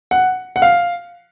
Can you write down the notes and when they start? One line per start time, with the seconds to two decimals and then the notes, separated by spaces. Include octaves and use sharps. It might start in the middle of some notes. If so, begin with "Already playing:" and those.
0.11 F#5
0.56 F#5
0.62 F5